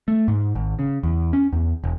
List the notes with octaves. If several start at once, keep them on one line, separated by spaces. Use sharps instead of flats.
A3
G#2
G#1
C#3
E2
C#4
E2
E1